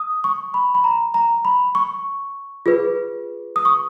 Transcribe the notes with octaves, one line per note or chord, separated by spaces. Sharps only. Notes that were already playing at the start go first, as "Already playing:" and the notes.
Already playing: D#6
C#6
B5
B5
A#5
A#5
B5
C#6
F4 G#4 B4
D#6
C#6